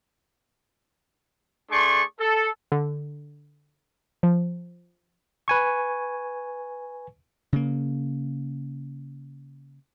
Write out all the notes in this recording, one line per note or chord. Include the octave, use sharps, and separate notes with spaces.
A3 D4 G#4 D5 C6 C#6
A4
D3
F3
B4 G#5 C#6
C#3 A#3